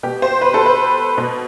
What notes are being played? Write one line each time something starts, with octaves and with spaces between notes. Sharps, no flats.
B2 G4
C5
B4
A4
B4
B2